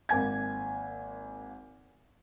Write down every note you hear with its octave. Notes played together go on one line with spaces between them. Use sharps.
G#1 A#3 G#5 G#6